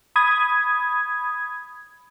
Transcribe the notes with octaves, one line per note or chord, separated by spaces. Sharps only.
B5 D#6 G#6